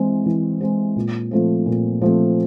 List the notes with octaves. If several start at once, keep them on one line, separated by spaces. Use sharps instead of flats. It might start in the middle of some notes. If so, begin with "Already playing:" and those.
Already playing: E3 G#3 C4
E3
G#3 C4
A#2
F3 A3 C4
A#2
F3 A3 C4